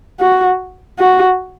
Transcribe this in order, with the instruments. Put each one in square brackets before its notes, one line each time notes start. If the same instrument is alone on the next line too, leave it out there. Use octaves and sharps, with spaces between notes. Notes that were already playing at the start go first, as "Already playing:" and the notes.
[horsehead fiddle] F#4
F#4